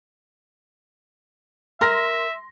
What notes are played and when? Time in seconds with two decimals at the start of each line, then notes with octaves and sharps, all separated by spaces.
1.81 A#4 E5 C6 A#6